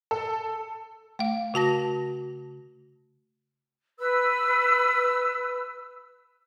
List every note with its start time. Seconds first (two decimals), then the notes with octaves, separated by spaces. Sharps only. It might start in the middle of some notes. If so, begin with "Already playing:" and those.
0.11 A4
1.19 A3 F5
1.54 C#3 F#4 A5 A#6
3.99 B4 E6